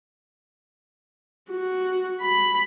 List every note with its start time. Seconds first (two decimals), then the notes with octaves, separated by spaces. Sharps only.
1.50 F#4
2.21 B5